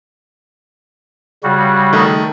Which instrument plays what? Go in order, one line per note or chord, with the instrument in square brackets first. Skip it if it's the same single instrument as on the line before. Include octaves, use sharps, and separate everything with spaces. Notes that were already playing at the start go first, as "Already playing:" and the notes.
[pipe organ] C#3 G3 F#4
[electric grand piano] D#3 A3 D#6